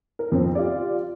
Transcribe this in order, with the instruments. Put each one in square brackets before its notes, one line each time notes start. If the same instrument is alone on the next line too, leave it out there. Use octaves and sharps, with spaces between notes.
[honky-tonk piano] A#4
F2 C#3 C4
F4 G4 D5